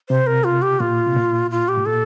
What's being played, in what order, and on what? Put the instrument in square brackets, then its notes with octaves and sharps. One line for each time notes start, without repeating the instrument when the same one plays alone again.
[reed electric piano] C3 [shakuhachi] C5
[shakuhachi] A#4
F4
G4
[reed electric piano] A#2 [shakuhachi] F4
[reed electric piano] C3
A#2
[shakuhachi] F4
G4
[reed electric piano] A2
[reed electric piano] A#2 [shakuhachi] A4